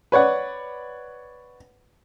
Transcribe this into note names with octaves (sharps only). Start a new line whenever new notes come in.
B4 C#5 D5 F#5